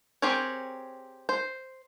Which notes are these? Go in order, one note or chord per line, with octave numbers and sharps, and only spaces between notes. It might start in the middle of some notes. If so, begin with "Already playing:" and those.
C4 G4 G#4 A#4 C#5
C5